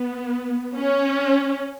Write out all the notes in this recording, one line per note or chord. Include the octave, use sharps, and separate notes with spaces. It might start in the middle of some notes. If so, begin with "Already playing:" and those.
Already playing: B3
C#4